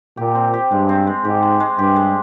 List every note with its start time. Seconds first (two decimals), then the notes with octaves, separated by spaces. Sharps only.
0.17 A#2 G4
0.35 C4
0.54 G4
0.71 G2 G#3
0.89 C4
1.07 G#3
1.24 G#2 G4
1.42 G#3
1.60 G#3
1.78 G2 G4
1.96 G#3